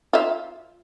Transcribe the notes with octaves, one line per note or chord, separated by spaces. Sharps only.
F4 E5